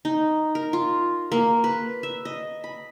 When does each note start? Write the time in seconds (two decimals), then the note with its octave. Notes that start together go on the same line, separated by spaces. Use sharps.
0.05 D#4
0.55 A#4
0.73 F4
1.32 A#3
1.64 B4
2.03 E5
2.25 D#5
2.64 B5